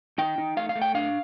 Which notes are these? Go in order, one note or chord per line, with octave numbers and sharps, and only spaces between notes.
D#4 G5
D#4
A3 F5
F5
A3
G5
D4 F5